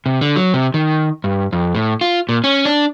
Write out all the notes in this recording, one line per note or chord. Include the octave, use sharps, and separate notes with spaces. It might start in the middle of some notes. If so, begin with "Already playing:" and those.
C3
D3
F#3
C3
D#3
G2
F2
A2
F4
A#2
C#4
D4